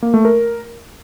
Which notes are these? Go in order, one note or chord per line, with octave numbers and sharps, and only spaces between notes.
A#3
A3
A#4